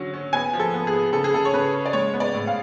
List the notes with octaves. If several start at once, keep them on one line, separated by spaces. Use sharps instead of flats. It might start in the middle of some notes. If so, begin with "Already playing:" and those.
Already playing: D3 F#3 C#4
C#4
B3 G#5
F3
A4
B3
G#4
B3
C#3 A4
G#4
C#3 A4
C#5
C#3 B4
C#4
D5
G#3 C#5
B3
D5
A2
F5